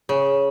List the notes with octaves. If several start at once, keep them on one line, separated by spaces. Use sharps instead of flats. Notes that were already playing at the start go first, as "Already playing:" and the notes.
C#3